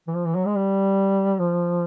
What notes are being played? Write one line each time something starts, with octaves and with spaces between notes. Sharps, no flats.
E3
F3
E3
F#3
G#3
G3
F3